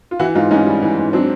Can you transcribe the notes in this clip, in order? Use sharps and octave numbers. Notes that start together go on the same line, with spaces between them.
F4
E3 E4 F#4
G#2 D#4 F4
G#2 C#4 D#4
G3
E3
G#2
F#3 C4 D4